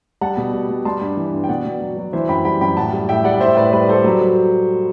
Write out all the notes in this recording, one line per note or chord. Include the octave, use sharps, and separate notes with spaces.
G3 F#5 A5
B2
G3
G3
G3 A5 C6
G2
E3
G2
G5
B2 D5 F#5
B2
F#3
F#3
E3 C5 E5
F#2 G5 B5
G3 G5 B5
F#2 G5 B5
A2 F#5 A5
G3
A2 E5 G5
G3 D5 F#5
A2 C5 E5
A2 B4 D5
G3 B4
G3 A4 C5
F#3
F#3